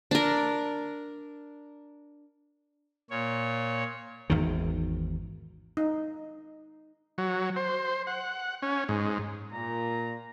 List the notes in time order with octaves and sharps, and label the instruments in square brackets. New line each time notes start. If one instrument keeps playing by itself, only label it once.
[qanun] D4 A#4
[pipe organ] A#2 C#5
[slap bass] G#1 E2 D#3
[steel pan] D#4
[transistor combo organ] F#3
C5
F#5
C#4
G#2
[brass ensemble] A#2 [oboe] A#5